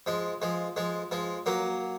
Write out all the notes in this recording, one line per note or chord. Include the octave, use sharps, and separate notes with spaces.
F3 G#3
F3 G#3
F3 G#3
F3 G#3
F#3 A#3